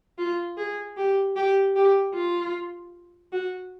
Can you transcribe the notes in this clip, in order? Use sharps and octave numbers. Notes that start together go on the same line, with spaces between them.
F4
G#4
G4
G4
G4
F4
F#4